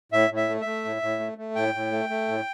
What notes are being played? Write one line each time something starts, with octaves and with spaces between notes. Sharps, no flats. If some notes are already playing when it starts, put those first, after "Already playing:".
A2 E5
A2
E5
A3
A3 E5
A2
A2
A3
A3
A2 G5
A2
A3
A3
A2